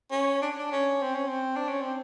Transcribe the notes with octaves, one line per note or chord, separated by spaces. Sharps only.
C#4
D4
D4
C#4
C4
C#4
C4
D4
C#4
C4